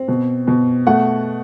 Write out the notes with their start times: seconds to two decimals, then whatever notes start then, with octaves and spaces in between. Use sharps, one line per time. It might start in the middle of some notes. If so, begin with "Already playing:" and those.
Already playing: C4
0.08 B2
0.47 B2
0.87 A3 F#5